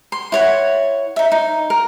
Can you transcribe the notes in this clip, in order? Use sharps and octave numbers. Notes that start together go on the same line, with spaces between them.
C6
E4 C#5 F#5
D#4 E5
D#4
A#4